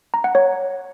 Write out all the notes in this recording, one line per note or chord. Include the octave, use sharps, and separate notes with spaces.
A#5
F#5
C#5